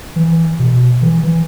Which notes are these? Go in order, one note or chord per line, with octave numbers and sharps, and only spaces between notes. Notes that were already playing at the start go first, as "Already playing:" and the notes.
E3
B2
E3
E3